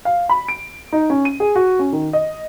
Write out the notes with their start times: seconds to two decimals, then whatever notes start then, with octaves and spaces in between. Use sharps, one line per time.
0.05 F5
0.29 B5
0.48 D7
0.92 D#4
1.10 C#4
1.25 D#7
1.40 G#4
1.55 F#4
1.79 C#4
1.92 D#3
2.13 D#5